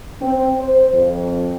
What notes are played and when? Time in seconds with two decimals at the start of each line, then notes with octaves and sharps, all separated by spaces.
0.22 C4
0.60 C5
0.94 F2